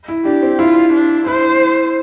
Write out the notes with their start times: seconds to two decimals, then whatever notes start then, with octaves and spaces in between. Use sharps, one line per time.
0.08 E4
0.25 D4 G4
0.42 C4
0.59 E4 F4
0.93 D4
1.27 E4 C5